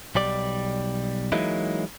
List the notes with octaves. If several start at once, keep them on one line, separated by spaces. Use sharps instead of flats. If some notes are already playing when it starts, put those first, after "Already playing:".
B1 G3 D5
E3 F#3 G#3 A#3 D#4 E4